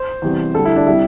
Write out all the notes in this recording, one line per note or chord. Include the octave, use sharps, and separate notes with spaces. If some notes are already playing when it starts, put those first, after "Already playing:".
Already playing: C5
E2 C3 G3
D2 D3 G3 A4
E4
D4
C3 G3 E4